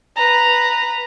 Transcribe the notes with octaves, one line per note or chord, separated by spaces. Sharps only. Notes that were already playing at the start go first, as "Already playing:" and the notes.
B4 A#5